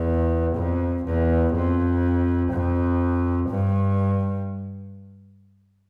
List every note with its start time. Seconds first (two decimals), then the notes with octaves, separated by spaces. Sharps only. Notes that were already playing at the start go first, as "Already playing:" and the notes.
Already playing: E2
0.56 F2
1.06 E2
1.54 F2
2.52 F2
3.49 G2